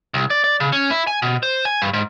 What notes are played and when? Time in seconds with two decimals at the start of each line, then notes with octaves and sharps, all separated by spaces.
0.14 C2
0.30 D5
0.44 D5
0.60 C#3
0.73 C#4
0.91 E4
1.07 G#5
1.22 B2
1.43 C5
1.65 G#5
1.82 G2
1.93 G#2